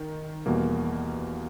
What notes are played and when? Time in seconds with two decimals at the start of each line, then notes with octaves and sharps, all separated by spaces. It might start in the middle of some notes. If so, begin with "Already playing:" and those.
Already playing: D#3
0.46 E2 B2 G3 A#3